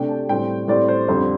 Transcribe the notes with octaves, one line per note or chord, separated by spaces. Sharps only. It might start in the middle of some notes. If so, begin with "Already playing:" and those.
Already playing: C3 A3 D4 G5
A5
A2 G3 C4 G5
A2 G3 C4 D5
C5
F2 D3 G3 C4 C5